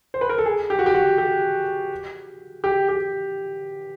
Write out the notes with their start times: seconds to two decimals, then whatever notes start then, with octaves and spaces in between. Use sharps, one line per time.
0.14 C5
0.21 B4
0.29 A#4
0.38 A4
0.46 G#4
0.70 G4
0.79 F#4
0.86 G4
0.95 F#4
1.18 G4
2.64 G4
2.89 G4